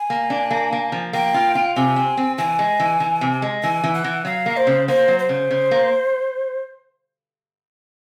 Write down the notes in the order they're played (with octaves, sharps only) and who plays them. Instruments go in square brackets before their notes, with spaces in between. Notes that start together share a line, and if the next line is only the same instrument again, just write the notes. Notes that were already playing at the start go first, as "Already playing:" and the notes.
Already playing: [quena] G#5
[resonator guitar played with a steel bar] A#3
D4
A#3
A#3
F3
[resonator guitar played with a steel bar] A#3 [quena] G5
[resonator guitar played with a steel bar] F4
F4
[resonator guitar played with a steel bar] C3 [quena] G#5
[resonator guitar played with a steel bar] C4
C4
[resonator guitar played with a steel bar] E3 [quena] G#5
[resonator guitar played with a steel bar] G#3
E3
E3
C3
G#3
[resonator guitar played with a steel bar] E3 [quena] G#5
[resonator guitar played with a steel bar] E3
[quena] F#5
[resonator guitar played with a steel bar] E3
[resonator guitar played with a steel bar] F#3 [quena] F5
[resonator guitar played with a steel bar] A#3
[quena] C5
[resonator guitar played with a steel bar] C#3
[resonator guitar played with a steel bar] A#3 [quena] C5
[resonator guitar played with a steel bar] F#3
[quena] C5
[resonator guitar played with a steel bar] C#3
C#3
A#3